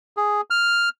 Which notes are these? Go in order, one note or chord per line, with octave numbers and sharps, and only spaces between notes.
G#4
F6